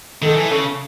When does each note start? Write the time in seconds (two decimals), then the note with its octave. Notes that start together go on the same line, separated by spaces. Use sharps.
0.22 D#3 A4
0.36 E3
0.51 C#3